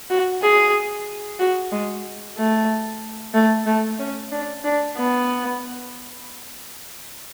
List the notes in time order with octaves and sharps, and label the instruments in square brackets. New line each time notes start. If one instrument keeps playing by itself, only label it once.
[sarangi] F#4
G#4
F#4
G#3
A3
A3
A3
C#4
D4
D4
B3